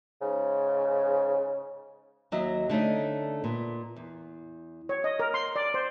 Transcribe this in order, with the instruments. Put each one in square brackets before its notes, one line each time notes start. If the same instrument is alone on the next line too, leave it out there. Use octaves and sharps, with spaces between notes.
[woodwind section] G#2 C#3
[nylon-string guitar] D#2 F#3 D#5 E5
D3 A3 C#4 D#4
A#2 B3
E2
[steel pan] C#5
D#5
A#4
C6
D5
C5